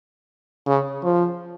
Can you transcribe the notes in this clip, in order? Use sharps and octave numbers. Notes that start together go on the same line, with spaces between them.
C#3
F3